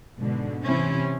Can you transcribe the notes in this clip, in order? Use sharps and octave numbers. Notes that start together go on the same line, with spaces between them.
G#2 B2 D3
C3 E3 C4 C#4 E4